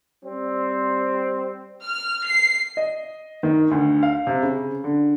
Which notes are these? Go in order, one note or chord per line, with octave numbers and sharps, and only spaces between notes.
G3 C4
F6
C7
D#5
D#3
D2
F5
C3
C#3
D3